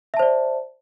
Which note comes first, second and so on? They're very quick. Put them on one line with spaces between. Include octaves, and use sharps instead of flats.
E5 A5 C5 D5